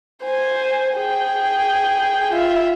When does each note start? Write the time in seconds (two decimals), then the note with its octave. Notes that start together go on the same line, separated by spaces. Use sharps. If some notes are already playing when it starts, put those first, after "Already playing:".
0.24 C5 G#5
0.97 G#4 G5
2.33 F4 E5